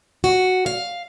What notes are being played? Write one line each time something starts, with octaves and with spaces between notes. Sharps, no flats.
F#4
F5